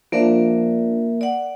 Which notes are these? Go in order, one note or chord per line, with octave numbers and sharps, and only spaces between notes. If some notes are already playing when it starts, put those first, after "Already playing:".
F3 A#3 D4 A#4 E5
D5 F#5